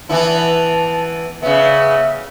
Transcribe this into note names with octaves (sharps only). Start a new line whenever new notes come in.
E3 B3 E4 A5
C#3 B3 E5